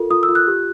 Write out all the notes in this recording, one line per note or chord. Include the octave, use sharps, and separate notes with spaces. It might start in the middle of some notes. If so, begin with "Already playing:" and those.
Already playing: F4 A4 A#4
F4 D#6
E6
F4
F#6
G4